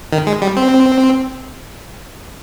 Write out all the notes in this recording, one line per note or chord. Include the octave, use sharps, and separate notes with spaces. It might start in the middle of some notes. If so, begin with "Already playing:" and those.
D#3
G#3
G3
C4